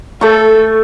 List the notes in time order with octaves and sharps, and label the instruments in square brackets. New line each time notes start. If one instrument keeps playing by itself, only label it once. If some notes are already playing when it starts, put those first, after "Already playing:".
[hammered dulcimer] A3 C#6 [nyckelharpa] A4